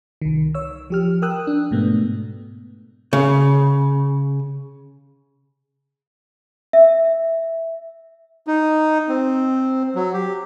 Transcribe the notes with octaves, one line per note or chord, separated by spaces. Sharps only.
C2 D#3
C#5 E6
F3 G4 F6
A#4 G5 D#6 E6 F#6
D4
G#2 B2 A3 B3
C#3
E5
D#4
C4
F#3
G4